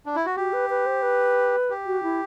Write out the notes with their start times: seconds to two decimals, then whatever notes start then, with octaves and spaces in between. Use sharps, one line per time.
0.06 D4
0.16 E4
0.26 F#4
0.36 F#4 G4
0.53 B4
0.70 B4
0.86 C5
1.02 B4
1.70 G4
1.86 F#4
2.03 E4